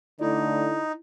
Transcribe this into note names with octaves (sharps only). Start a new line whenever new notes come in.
D3 A3 D#4 E4 D5